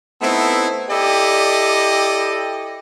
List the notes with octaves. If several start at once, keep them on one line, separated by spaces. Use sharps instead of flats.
A3 B3 C4 D#4 E4
E4 G4 A4 D5 D#5